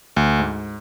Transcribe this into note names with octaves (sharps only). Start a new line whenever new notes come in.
D2
G#2